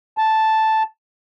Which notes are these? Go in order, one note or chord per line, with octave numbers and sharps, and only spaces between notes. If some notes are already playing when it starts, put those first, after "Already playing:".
A5